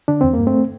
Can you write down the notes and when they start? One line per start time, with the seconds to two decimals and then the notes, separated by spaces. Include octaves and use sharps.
0.08 D3 D4
0.21 E2 C4
0.34 A#3
0.39 G2
0.47 A3 C4